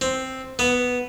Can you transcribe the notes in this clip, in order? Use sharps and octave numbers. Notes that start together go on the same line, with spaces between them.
C4
B3